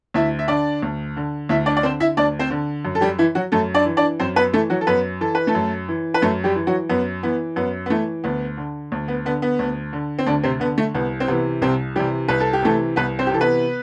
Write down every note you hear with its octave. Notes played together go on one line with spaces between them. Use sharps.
D2 E4 E5
E5
D3 D4 D5
D2
D3
D2 E4 E5
D4 D5
D5
D3 C4 C5
E4 E5
D2 D4 D5
C4 C5
D3
F#2
A4
G3 G4
E3 E4
F#3 F#4
F#2 A3 A4
D4 D5
E3
D4 D5
F#2 C4 C5
B3 B4
E3 A3 A4
F#3 F#4
A4
F#2 B3 B4
E3 A4
B4
A3 A4
F#2
E3
B4
F#2 A3 A4
G3 G4
E3
F#3 F#4
F#2 B3
E3 B3
F#2 B3
B3
E3 A3
D2 B3
D3
D2
B3
D3 B3
B3
D2
D3
C4
D2 D3 D4
C3 C4
D3 B3
A3
C2 B3
C4
C3 E3 B3
C2 C3 C4
C3 E3 G3 G4
C2 B4
A4
G4
C3 E3 A3 A4
C2 B3 B4
C4 C5
G4
C3 E3 A4
B3 B4